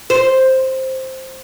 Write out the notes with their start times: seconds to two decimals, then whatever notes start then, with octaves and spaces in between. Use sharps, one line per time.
0.10 C5